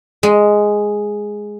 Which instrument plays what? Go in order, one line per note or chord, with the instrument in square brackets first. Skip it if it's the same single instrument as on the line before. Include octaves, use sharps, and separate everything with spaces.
[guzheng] G#3